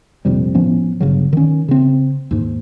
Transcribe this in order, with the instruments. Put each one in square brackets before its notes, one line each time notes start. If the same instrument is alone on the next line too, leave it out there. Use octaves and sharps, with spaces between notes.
[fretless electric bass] A#1 F2 C3 G3
A2 F3 B3 C#4
G1 C#3 F#3
D#3 C#4
C#3 C4
D#2 G#2